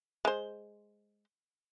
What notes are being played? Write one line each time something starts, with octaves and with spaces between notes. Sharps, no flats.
G#3 C5